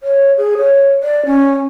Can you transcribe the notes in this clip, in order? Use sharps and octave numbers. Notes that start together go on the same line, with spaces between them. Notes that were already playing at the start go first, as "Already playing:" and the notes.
C#5
G#4
C#5
D5
C#4